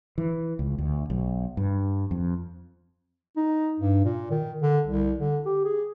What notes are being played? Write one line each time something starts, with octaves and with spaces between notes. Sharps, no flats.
E3
C#2
D2
B1
G2
F2
D#4
G2
A#2
D#3
D3
C2
D3
G4
G#4